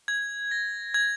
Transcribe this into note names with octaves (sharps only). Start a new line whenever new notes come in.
G#6
A#6
G#6